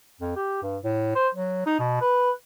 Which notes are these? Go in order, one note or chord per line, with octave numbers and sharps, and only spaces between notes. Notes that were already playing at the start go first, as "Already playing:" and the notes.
F2
G4
G2
A2
C5
F#3
D#4
B2
B4